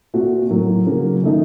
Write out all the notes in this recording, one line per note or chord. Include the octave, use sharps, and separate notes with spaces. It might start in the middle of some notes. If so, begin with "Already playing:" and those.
A#2 A3 C4 F#4
A2 F#3 A#3
C#3 F#3 A#3
D#3 A3 D#4